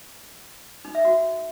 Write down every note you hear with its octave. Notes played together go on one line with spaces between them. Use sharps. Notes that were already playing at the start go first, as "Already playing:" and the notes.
D#4
E5
F#4